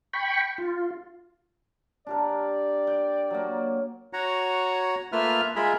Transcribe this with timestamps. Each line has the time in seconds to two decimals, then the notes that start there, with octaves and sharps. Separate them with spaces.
0.13 G5 B5 C#6
0.58 F4
2.07 D4 G4 A#4 D5
2.87 G5
3.30 F#3 A#3
4.13 F#4 C#5 F#5 A#5
5.12 A3 A#3 F4 B4 E5 F6
5.56 G#3 F4 G#4 A#4 E5 B5